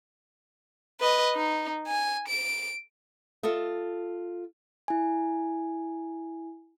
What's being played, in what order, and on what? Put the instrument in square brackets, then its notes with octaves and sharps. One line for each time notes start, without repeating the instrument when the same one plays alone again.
[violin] B4 D#5
D#4
G#5
D7
[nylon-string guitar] F4 A4 D#5 E5
[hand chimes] E4 G#5